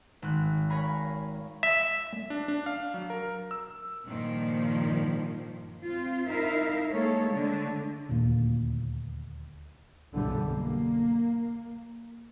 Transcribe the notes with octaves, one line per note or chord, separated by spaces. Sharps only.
G#1 F#6
A#4 C#5 F5 G#5 A#5 B5
E5
D4
D4
F5
F#3
A#4
E6
G2 A#2 D#3 F3
C4 F4
D#4 E4 A#4 E5 F5
G#3 A#3 A4 C#5
D3 G#3 A3
D#1 D2 A#2 A#3
B1 F#2 D3 E3 G3
A#3